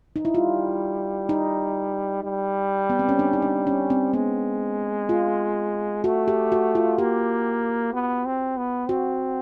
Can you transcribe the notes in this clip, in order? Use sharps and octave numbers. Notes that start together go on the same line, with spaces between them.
D#4
E4
G3 F4
D#4
G3
B3
C4
C#4
D4
D#4
D4
C#4
C4
G#3 B3
F4
A3 F#4
G4
F#4
F4
A#3 G4
B3
C4
B3
C4 F#4